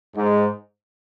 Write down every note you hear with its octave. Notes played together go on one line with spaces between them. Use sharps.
G#2